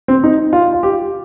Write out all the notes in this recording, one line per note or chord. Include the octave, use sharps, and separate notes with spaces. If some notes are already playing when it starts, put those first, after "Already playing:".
C4
D#4
F4
F4
G4